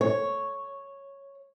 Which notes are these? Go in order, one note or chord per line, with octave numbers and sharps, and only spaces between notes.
C#5